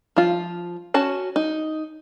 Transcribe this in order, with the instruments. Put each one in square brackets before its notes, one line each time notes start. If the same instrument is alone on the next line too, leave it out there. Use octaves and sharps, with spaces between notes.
[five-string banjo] F3 F4
C#4 F#4 A5
D#4